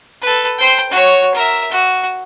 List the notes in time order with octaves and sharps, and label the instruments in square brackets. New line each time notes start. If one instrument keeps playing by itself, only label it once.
[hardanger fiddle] A4 B4
C5 G5
F#4 C#5
A#4 E5
F#4